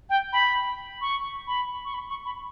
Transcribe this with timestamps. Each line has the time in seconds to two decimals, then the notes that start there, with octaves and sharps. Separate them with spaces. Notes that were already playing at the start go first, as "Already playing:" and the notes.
0.10 G5
0.33 B5
1.01 C#6
1.47 B5
1.85 C#6
1.94 B5
2.09 C#6
2.25 B5